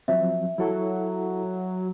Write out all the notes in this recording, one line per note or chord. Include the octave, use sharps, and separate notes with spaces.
F3 F#3 C4 E5
F#3 E4 A4